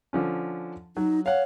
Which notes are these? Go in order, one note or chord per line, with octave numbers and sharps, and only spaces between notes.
D3 F3 C#4
F#3 D#4
C#5 F5 F#5